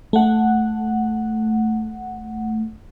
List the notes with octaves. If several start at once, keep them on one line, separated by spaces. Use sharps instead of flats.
A3 F#5